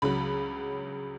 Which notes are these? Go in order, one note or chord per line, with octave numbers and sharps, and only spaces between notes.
C#2 C#3 F#3 B5